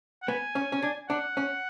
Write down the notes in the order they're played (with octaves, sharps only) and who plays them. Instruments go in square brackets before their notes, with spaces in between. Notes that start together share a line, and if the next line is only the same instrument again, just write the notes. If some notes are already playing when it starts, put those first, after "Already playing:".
[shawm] F#5
[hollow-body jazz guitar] B3 [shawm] G#5
[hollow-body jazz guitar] C#4
C#4
D4
[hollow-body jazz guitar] D4 [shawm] F#5
[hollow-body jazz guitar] C#4